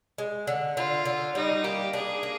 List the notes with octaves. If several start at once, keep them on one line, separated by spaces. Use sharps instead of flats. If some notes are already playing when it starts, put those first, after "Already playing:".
G#3
D3
D3 F4
D3
G3 D#4
A#3 G4
D4 G#4
A#3